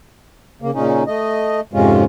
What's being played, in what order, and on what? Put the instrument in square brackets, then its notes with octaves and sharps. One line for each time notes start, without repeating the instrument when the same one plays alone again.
[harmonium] C#3 A#3
A#2 C#3 C#4 D#4
A3 D#5
F2 G#2 C3 G#3 C#4 F4